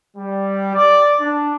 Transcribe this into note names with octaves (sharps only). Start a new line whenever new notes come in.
G3
D5
D4